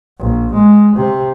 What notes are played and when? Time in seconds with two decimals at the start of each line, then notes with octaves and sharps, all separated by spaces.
0.19 A#1
0.54 G#3
0.96 C3